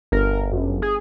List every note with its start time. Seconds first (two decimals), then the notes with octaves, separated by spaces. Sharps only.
0.12 G1 A#4
0.52 F#2
0.82 G#4